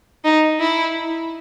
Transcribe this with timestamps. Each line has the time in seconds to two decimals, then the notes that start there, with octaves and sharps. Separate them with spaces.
0.25 D#4
0.60 E4